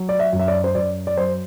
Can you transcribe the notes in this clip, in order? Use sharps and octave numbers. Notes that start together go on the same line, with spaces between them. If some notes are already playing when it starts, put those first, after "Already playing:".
Already playing: F#3
D5
E5
F#2
E5
D5
C5
F#2 D5
D5
F#3 C5